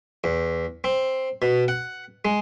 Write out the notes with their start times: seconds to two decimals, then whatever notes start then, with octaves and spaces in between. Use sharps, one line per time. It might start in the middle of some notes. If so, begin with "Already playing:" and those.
0.24 E2
0.84 C4
1.42 B2
1.68 F#5
2.25 G#3